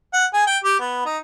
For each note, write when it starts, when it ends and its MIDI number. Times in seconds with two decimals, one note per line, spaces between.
0.13 0.25 78
0.33 0.46 68
0.46 0.58 79
0.63 0.75 67
0.80 1.02 59
1.05 1.18 63